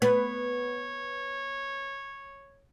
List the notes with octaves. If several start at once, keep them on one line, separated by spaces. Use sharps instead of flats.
B3 C#5